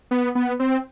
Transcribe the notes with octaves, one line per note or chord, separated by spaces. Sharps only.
B3
B3
C4